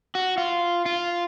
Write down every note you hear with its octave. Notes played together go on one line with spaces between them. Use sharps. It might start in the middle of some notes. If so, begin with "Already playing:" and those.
F#4
F4
F4